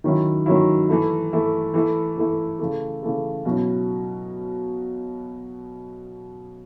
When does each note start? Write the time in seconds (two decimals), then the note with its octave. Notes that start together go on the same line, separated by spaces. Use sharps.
0.04 D#3 F#3 C#4 E4
0.46 D#3 F#3 C#4 E4
0.89 E3 A3 E4
1.32 E3 A3 E4
1.74 E3 A3 E4
2.17 E3 A3 E4
2.59 C#3 E3 A3
3.03 C#3 E3 A3
3.45 B2 F#3 C#4 E4